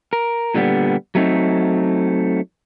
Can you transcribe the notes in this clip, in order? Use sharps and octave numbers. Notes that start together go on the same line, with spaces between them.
A#4
A#2 D3 G3 B3
F#3 A3 C4 D#4